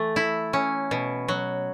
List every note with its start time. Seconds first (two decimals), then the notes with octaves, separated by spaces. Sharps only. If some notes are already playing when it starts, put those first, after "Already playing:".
Already playing: E3 A3
0.16 E4
0.53 C#4
0.91 B2
1.28 F#3